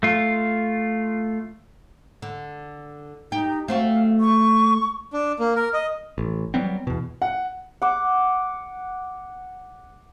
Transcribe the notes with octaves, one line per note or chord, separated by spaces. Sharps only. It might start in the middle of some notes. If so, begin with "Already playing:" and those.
A3 F4
D3
D#4 G4
A3 C4 F#4 F5
C#6
D4
A#3
A#4
D#5
A1
F#3 G3 B3 C4
E2 B2
F#5
F#5 D6